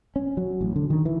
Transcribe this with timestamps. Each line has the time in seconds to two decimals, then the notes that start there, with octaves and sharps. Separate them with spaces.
0.16 C#4
0.37 F#3
0.61 A1
0.76 D3
0.90 D#3
1.05 E3